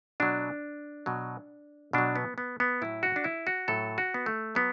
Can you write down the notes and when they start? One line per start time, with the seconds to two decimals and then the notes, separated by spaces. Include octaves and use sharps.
0.20 B2 F#3 D4
1.06 B2 F#3
1.93 B2 F#3 D4
2.16 B3
2.38 B3
2.60 B3
2.81 A2 F#3 E4
3.03 F#4
3.16 D4
3.24 E4
3.47 F#4
3.68 A2 F#3 A4
3.98 F#4
4.14 B3
4.26 A3
4.55 F#3 B3